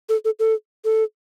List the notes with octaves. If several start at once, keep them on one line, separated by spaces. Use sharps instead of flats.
A4
A4
A4
A4